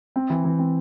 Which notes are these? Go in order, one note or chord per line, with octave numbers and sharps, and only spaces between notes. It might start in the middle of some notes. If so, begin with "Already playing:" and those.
C4
E3
E3
C4